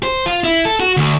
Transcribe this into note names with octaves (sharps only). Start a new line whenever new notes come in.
C5
F4
E4
A4
F#4
D2